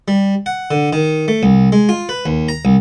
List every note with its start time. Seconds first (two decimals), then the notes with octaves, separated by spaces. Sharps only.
0.08 G3
0.46 F#5
0.71 D3
0.93 D#3
1.28 A3
1.43 C2
1.72 G#3
1.89 F4
2.09 B4
2.26 D#2
2.49 A#5
2.65 C2